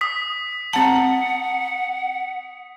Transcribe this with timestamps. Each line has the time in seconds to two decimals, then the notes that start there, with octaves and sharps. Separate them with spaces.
0.01 D#6 B6
0.73 C4 F#5 A5